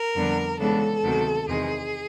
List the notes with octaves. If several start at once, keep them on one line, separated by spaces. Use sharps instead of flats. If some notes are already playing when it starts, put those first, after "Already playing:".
Already playing: A#4
F2 D3 G3 B3 D4
C#3 E3 G#3 B3 D4 A4
D2 C3 D#3 F#3 B3
E2 C3 D#3 G#3 G#4